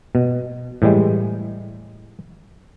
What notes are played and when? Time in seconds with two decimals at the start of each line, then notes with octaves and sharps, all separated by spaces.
0.15 B2
0.82 A2 E3 G3 G#3